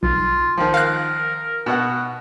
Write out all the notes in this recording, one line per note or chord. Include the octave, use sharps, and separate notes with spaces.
B1 F4
D#3 F3
A#4 F5 F#6
B2 F#4 F#5